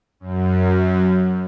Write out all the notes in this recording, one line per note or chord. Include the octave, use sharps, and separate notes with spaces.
F#2